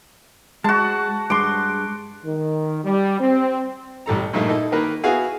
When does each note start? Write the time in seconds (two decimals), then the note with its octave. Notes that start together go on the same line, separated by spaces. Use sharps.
0.64 G#3 F#4 A5
1.30 G2 G#3 C6 D6
2.25 D#3
2.84 G3
3.21 C4
4.06 A1 G3 A4 A#5
4.33 G2 A#2 F3 A3 A#3 D#4
4.49 D#4 E4 A4
4.72 D#3 A#3 A#4 B4
5.04 B3 E4 F#4 G#4 F5 G#5